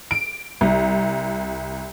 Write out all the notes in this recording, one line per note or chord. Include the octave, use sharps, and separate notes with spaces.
D7
C2